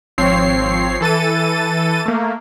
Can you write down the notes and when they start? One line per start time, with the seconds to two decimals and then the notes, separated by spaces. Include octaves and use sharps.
0.18 G#1 F3 C4 C#5 C7
1.01 E3 A4 A6 D#7
2.05 A3 A#3